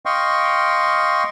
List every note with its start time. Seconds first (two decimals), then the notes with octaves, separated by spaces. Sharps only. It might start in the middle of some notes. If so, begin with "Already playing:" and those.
0.06 D#5 F5 G5 C6 C#6